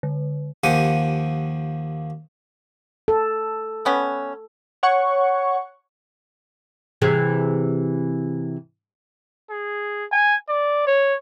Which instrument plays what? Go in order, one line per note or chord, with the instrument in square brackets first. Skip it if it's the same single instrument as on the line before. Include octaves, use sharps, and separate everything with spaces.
[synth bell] D3
[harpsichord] D#2 F3 G4 F#5 G#5
[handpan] A4
[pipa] G3 B3 C#4
[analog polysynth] C#5 F#5 C#6
[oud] C3 E3 G#4
[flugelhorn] G#4
G#5
D5
C#5